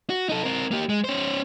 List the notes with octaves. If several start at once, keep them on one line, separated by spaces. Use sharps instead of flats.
F#4
D#4 A4
C4 A#4
A#3 G4
G#3
C#4 C5